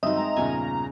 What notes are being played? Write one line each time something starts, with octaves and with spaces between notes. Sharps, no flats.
G2 D#3 F#3 C4 D#4 D#5 E5
G#3 A#5
E2 G2 A#2 C#3 C#4 G#5